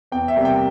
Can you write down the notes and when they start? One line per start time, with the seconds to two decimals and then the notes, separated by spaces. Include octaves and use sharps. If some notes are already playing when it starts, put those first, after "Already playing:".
0.12 E2 G5
0.28 E5
0.36 C3 G3 A#3
0.45 G5